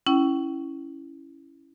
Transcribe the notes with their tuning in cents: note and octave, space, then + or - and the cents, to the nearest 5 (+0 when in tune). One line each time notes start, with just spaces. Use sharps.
C#4 +0 E4 +0 G5 -35